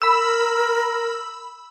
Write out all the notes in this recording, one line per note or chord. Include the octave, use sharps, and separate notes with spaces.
A#4 B5 E6